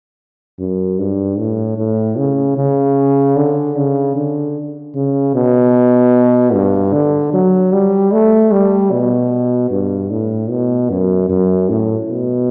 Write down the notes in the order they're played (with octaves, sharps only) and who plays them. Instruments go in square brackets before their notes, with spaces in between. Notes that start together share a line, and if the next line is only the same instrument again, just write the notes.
[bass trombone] F#2
G2
A2
A2
C#3
C#3
D3
C#3
D3
C#3
B2
G2
D3
F#3
G3
A3
G3
B2
G2
A2
B2
F#2
F#2
A2
B2